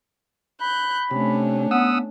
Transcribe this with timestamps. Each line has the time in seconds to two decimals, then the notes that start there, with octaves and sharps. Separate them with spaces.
0.61 B5 F#6 G6
1.11 C3 A3 C#4 D4
1.71 B3 F#5 D#6 E6